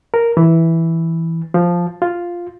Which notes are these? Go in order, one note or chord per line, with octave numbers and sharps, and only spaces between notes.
A#4
E3
F3
F4